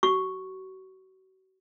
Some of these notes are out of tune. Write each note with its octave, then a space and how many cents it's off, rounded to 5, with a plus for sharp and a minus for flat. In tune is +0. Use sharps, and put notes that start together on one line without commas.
F#4 +35 C#6 +0